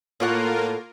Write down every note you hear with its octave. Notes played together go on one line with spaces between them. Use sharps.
A2 A#3 F4 A#4 C#5 F#5